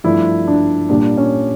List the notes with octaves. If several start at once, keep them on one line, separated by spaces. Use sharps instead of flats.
G2 F3 A3 E4
D4
A#2 G3 A#3 D4
C#4